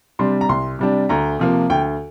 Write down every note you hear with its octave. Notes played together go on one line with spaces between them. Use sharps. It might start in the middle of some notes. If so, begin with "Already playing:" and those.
C3 G3 D4 C6
A#5
C2 C6
C3 G3 D4
D2 A#5
C3 F3 A#3
D2 G5